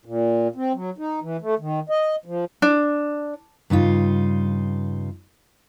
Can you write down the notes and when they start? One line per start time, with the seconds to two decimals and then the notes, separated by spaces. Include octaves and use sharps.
0.05 A#2
0.56 C4
0.74 F#3
0.98 D#4
1.22 E3
1.41 A3
1.59 D#3
1.89 D#5
2.26 F3
2.62 D4
3.70 G2 C#3 D#4 F4